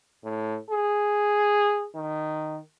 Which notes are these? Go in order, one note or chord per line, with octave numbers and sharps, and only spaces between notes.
A2
G#4
D#3